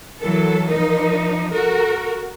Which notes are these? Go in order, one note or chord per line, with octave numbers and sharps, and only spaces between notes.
E3 F#3 A4 A#4
F3 D#4
F#4 A4 A#4